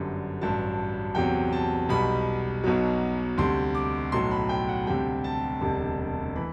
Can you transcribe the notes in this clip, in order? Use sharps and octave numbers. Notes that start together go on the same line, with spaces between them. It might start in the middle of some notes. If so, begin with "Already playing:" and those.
Already playing: G1 F#2 D3 G3
A1 G2 F#3 A5
E2 C3 F#3 G5
A5
B1 B2 G3 B5
B1 B2 F#3
D2 C3 G3 C6
D6
B1 A2 F#3 C6
B5
G5
F#5
D2 C3 G3 G5
A5
E1 D2 C3 G3
E3 B5